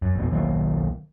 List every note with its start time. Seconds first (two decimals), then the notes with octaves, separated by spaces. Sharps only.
0.02 F#2
0.16 A#1 F2 B2
0.31 B1 D#3 F#3 A#3